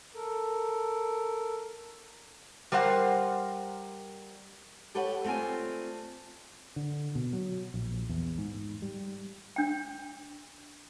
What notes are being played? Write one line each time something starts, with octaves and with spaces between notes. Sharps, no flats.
A4 A#4
G3 A#4 C5 F#5
G4 A4 B4 C#5 F#5
A3 C4 F4 D5 G#5
D3
B2
F#3
A#1
E2
G#2
G3
D4 G5